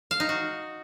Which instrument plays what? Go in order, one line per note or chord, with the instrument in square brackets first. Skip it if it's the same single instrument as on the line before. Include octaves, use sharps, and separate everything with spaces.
[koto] F5
D#4
F#4